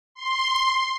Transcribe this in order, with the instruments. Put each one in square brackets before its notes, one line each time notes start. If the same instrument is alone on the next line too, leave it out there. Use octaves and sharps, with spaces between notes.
[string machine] C6